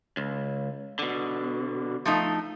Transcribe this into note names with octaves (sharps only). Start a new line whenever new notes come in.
C#2
B2 D3
F3 A3 D#4